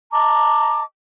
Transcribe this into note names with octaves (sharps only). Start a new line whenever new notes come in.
D#5 A5 A#5 D6